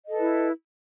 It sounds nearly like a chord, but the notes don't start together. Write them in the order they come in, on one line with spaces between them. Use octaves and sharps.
D#5 A4 B4 E4